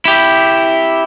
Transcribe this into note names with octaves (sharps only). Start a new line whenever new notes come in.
E4 G4